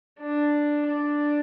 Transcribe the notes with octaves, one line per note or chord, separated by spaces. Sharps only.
D4
D4